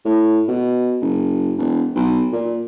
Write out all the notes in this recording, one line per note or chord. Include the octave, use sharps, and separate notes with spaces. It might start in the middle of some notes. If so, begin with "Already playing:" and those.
A2
B2
F#1
E1
B1
A#2